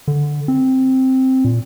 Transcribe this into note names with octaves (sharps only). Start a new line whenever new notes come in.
D3
C4
A#2